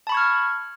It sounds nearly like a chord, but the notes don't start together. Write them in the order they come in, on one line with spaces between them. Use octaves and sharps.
A5 B5 C#6 G#6 F6